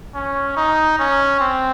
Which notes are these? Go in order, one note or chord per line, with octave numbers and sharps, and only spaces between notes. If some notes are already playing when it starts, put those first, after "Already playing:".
C#4
D#4
C#4
C4